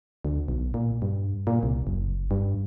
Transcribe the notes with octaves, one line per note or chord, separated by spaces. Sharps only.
D2
B1
A#2
G2
A#2
C2
F#1
G2